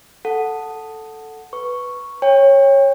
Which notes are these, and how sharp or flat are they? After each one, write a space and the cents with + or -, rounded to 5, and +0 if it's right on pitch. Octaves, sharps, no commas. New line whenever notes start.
A4 +0 F#5 +0
B4 +0 C#6 +0
C#5 -15 G5 +30